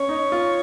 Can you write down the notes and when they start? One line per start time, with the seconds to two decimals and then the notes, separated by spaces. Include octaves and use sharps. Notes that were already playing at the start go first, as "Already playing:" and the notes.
Already playing: C#4 C#5
0.09 D#4
0.32 F4